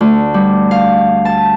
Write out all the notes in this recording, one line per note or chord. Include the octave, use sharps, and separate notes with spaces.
D2
G3
F5
A5